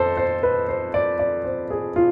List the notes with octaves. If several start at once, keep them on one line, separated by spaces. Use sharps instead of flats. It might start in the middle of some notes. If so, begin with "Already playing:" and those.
Already playing: F2 A4 C5
C5
B4
C5
D5
D5
C5
G#4
F4